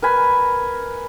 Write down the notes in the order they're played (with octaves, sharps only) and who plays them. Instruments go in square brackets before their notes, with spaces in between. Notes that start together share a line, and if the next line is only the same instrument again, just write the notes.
[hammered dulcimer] A#4 B4 G#5 B5